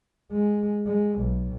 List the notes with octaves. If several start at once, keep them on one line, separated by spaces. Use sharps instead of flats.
G#3
G#3
B1